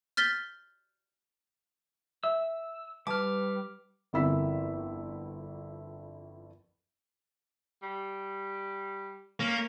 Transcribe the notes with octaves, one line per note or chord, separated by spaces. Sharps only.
F6 G6 A6 B6 G7
E5 E6
G3 B4 A5 D6 F6
G1 F2 E4 A#4 E6 B6
G3
A#3 C#4